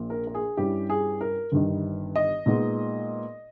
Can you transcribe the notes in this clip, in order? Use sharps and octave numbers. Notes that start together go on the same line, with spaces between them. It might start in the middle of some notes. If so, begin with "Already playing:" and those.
Already playing: A#1 A#2 A#3
A#4
A#4
G#4
G2 G3 C#4 E4 G4
G#4
A#4
G1 G2 D#3
D#5
A#2 G#3 B3 D#4